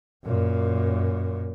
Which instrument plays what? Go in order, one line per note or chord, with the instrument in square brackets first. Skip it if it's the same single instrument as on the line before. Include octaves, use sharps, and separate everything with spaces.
[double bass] F#2 A#2